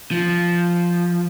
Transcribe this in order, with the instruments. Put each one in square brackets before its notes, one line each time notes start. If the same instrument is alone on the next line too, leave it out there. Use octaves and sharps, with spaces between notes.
[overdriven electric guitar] F3